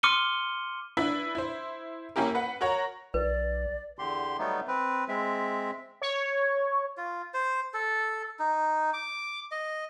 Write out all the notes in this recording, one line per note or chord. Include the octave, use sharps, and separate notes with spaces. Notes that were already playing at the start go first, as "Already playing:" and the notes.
C6 D6 F6 C#7 D#7 G7
D4 E4 B4 E5
E4 C5
A#3 C#4 E4 G4 A#4
B4 F#5
F#4 A#4 C#5 A#5
B1 B4 D5
E2 D3 G4 C6
F#3 G3 A3 B3 D#4
C4 B4
G#3 C4 E5
C#5
F4
C5
A4
D#4
D6
D#5